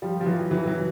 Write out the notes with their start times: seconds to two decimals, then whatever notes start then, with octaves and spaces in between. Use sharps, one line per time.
0.02 F3 G3
0.21 F3
0.26 E3 F#3
0.51 E3 F#3
0.67 E3 F#3